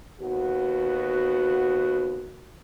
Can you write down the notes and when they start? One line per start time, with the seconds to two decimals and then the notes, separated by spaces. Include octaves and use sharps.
0.21 D#2 B3 F#4